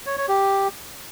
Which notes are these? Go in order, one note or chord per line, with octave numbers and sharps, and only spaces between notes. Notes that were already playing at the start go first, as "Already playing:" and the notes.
C#5
C#5
G4